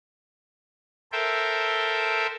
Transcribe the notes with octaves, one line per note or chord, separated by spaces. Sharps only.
A4 A#4 C5 E5 G5